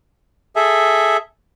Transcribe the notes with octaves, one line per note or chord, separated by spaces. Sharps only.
G#4 A4 E5